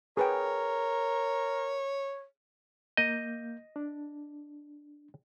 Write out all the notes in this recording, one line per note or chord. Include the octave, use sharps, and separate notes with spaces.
G#4 A#4 B4 C#5 G5
A#3 D#5 G6
D4